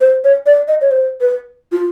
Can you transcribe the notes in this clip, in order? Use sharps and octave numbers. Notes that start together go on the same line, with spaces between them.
C5
C#5
D5
D#5
C#5
C5
B4
F4